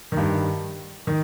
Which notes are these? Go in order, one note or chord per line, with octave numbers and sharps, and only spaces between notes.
G2 D#3
D#3